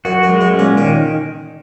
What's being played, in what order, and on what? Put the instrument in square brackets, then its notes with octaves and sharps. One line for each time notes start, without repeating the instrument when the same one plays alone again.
[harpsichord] F#2 [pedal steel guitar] F#4
[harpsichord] F#2
[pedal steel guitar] G#3
[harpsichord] F#2
[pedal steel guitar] C#4
[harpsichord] A#2
[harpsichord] A#2 [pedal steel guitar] D#3